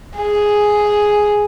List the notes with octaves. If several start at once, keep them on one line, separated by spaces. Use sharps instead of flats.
G#4